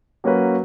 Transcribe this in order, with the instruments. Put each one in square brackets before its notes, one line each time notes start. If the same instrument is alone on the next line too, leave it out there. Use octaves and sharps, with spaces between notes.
[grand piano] F#3 A#3 C#4 F#4 B4